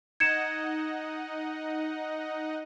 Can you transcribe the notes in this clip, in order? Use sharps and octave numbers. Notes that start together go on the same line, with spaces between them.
D#4 D#5 F#5 G#6 C#7 E7